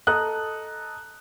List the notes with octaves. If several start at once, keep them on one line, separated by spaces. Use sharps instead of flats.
A4 D#5 A#5 D#6 F#6